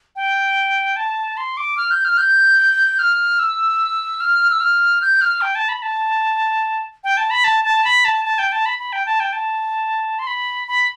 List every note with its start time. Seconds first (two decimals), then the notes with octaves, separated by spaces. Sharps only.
0.16 G5
0.96 A5
1.37 C6
1.57 D6
1.77 F6
1.91 G6
2.05 F6
2.18 G6
2.99 F6
3.39 E6
4.21 F6
4.50 E6
4.60 F6
5.01 G6
5.21 F6
5.41 G5
5.55 A5
5.69 B5
5.82 A5
7.04 G5
7.17 A5
7.31 B5
7.44 A5
7.65 A5
7.85 B5
8.05 A5
8.25 A5
8.39 G5
8.52 A5
8.66 B5
8.79 B5
8.93 G5
9.06 A5
9.20 G5
9.33 A5
10.19 C6
10.27 B5
10.68 B5